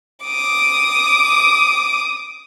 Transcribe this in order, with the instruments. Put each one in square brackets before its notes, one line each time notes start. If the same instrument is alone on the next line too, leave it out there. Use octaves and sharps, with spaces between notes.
[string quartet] D6 D#6